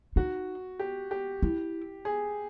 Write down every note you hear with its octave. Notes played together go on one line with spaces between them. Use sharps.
D#4 F#4
G4
G4
E4
G#4